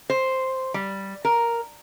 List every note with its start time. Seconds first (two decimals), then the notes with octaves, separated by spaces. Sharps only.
0.10 C5
0.74 G3
1.25 A#4